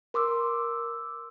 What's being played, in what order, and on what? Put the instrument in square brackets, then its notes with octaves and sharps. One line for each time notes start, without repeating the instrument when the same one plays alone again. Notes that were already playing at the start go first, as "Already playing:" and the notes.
[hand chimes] A#4 C6 D6 E6